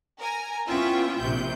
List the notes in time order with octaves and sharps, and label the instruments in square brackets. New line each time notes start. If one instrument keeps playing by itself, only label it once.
[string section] A#4 G#5 A#5
B3 C#4 E4 F4 E5 G5
A#1 C3 G6